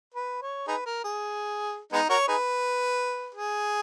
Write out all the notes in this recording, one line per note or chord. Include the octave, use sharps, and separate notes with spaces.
B4
C#5
D#4 G#4 B4
A#4
G#4
G#3 B3 D#4
F#4 A#4 C#5
D#4 G#4 B4
G#4